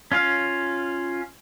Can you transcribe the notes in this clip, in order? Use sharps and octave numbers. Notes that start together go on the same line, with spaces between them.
C#4 F4 F5